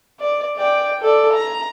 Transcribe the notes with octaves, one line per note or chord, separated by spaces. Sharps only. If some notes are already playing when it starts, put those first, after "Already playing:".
D5
D5 G5
A4 D5
A#5